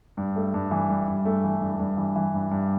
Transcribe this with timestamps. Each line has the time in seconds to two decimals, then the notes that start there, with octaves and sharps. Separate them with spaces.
0.17 G2
0.36 A3
0.54 G2
0.71 E3
0.89 G2
1.08 G2
1.25 A3
1.44 E3
1.61 G2
1.79 G2
1.97 E3
2.16 E3
2.34 G2
2.51 G2